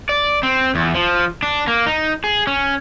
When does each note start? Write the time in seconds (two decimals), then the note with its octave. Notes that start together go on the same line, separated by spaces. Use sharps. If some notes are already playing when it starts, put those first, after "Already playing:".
0.09 D5
0.43 C4
0.75 E2
0.95 F3
1.43 D4
1.67 A#3
1.86 D#4
2.24 G#4
2.47 C#4